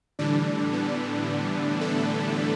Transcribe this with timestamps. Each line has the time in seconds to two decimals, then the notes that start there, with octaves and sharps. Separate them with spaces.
0.19 A2 D3 E3 G3 D4
0.73 B3
1.81 A3 A4